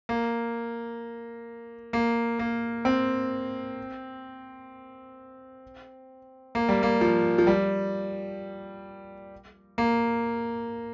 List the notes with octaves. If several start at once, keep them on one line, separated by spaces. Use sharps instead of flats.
A#3
A#3
A#3
C4
A#3
G3
A#3
F3
F3
G3
A#3